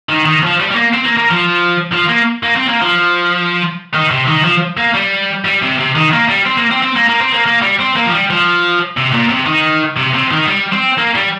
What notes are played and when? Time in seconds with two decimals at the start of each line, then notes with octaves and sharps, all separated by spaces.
0.10 D#3
0.26 D#3
0.43 F3
0.60 G3
0.71 G3
0.75 A#3
0.93 C4
1.05 A#3
1.17 A#3
1.31 F3
1.93 F3
2.09 A#3
2.43 A#3
2.56 C4
2.68 A#3
2.82 F3
3.94 D#3
4.11 C3
4.28 D#3
4.44 F3
4.77 A#3
4.95 G3
5.45 G3
5.62 C3
5.78 C3
5.95 D#3
6.12 A#3
6.29 G3
6.46 C4
6.57 A#3
6.71 C4
6.83 C4
6.96 A#3
7.09 A#3
7.20 C4
7.33 A#3
7.46 A#3
7.62 G3
7.80 C4
7.96 A#3
8.06 F3
8.13 G3
8.30 F3
8.97 C3
9.13 A#2
9.30 C3
9.46 D#3
9.97 C3
10.14 C3
10.31 D#3
10.47 G3
10.72 C4
10.98 A#3
11.15 G3